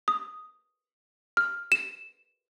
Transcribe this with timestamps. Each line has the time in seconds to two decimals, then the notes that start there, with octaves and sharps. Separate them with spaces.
0.08 D#6
1.37 F6
1.72 E7